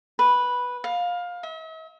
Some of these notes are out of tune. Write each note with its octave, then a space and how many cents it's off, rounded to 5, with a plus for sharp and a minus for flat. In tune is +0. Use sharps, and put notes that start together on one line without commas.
B4 -5
F5 +20
E5 -45